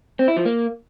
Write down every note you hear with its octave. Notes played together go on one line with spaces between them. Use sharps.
C4
E4
F3
A#3